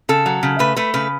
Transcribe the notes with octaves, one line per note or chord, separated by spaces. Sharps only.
C#3 A4
F#3
C#3
A3 B4
A3 B4
C#3 B4